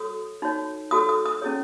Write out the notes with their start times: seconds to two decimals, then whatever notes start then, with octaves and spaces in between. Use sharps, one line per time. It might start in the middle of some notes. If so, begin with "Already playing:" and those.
Already playing: F#4 A4 C#5 D#6
0.42 D#4 F#4 C#5
0.91 F#4 A4 C#5 D#6
1.09 D#6
1.26 D#6
1.42 C#4 E4 G#4 C#5